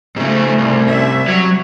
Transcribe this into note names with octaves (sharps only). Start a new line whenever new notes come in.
G#2 C#3 A3
C2
C#4 E5
F#3 G3